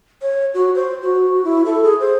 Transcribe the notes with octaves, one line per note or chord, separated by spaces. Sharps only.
C#5
F#4
C5
F#4
E4
A4
G#4
C5